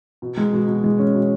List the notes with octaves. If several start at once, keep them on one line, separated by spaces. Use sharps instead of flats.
B2
G#3
B2
B2
G#3
C#4
B2